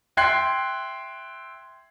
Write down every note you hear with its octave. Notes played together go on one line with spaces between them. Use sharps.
E5 G5 C6 F#6 G#6 C7